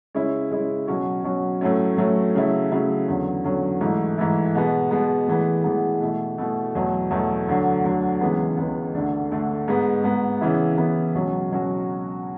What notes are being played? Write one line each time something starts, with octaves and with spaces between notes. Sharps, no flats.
C#3 G#3 C#4 E4
C#3 G#3 C#4 E4
B2 F#3 C#4 F#4
B2 F#3 C#4 F#4
A2 F#3 A3 C#4
A2 F#3 A3 C#4
C#3 F#3 A3 E4
C#3 F#3 A3 E4
E2 D3 F#3 C#4
E2 D3 F#3 C#4
G#2 E3 A3 E4
G#2 E3 A3 E4
B2 G#3 B3
B2 G#3 B3
A2 E3 G#3 B3
A2 E3 G#3 B3
B2 A3 E4
B2 A3 E4
E2 B2 F#3 A3
E2 B2 F#3 A3
D2 D3 F#3
D2 D3 F#3
C#2 C#3 E3 G#3 B3
C#2 C#3 E3 G#3 B3
D2 D3 A3 D4
D2 D3 A3 D4
G#2 G#3 B3
G#2 G#3 B3
C#3 E3 B3 E4
C#3 E3 B3 E4
C#2 B2 F#3 C#4 F#4
B2 F#3 C#4 F#4